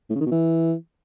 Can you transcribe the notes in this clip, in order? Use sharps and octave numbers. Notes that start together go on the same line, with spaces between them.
A2
C#3
D#3
B2
E3